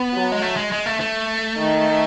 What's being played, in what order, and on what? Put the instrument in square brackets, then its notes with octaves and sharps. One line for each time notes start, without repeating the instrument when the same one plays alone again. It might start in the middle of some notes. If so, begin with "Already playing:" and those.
Already playing: [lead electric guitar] B3
[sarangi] F#3
[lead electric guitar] G#3
A3
G#3
G#3
A3
A3
[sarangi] D#3